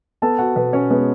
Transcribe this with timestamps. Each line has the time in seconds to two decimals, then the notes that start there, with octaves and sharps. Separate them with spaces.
0.22 B3 A4 A5
0.39 F#4 F#5
0.56 B2 B3 B4
0.73 C#4 C#5
0.90 G#3 B3 B4